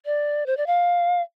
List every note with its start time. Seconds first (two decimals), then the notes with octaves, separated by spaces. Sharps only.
0.06 D5
0.46 C5
0.57 D5
0.67 F5